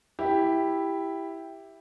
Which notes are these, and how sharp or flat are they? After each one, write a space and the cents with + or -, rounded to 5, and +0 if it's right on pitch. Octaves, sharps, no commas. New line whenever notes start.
E4 +0 G4 +5